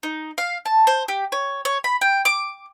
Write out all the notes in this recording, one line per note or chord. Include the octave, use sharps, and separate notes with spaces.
D#4
F5
A5
C5
G4
C#5
C#5
B5
G5
D6